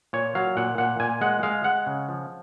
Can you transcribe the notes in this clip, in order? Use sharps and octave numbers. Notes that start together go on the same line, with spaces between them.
A#2 C#5
F#3 F5
A#2 F#5
A#2 F#5
A#2 G#5
G#3 F#5
G#3 F5
G#3 F#5
C#3
F3